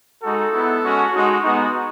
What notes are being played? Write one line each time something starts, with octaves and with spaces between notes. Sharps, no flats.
G#3 D#4 F#4 A4
B3 E4
G#3 C#4 F#4
G#3 D#4 F#4
G#3 B3 D#4 F#4